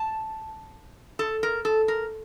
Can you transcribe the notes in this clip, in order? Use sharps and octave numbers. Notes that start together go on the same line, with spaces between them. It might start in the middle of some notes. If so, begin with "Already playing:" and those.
Already playing: A5
A4
A#4
A4
A#4